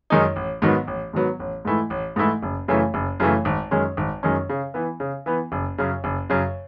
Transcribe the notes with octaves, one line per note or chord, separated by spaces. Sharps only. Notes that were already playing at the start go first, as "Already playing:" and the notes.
F#2 D#3 G#3 D#4
A1
G#2 D#3 F#3 B3
A1
G#2 D#3 F#3 B3
A1
G#2 E3 A3 E4
A1
G#2 E3 A3 E4
F#1
F#2 C#3 E3 A3
F#1
F#2 C#3 E3 A3
G#1
F#2 D#3 G#3 C#4
G#1
F#2 D#3 G#3 C#4
C#3
E3 B3
C#3
E3 B3
F#1
F#2 C#3
F#1
F#2 C#3